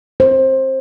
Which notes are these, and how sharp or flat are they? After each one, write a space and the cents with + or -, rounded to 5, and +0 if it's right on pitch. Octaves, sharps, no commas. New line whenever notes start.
C5 +20